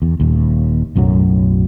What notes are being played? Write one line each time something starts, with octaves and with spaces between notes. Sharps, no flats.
E2
D#1 D#2
B1 F#2 A2 F#3